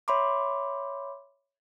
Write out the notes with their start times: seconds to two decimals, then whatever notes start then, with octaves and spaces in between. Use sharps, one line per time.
0.08 C#5 E5 B5 C6 D6